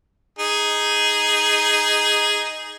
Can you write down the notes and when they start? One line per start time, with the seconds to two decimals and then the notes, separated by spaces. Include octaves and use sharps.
0.39 D#4 G#4